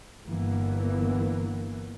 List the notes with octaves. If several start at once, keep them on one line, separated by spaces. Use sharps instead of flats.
G1 G2 E3 A#3 B3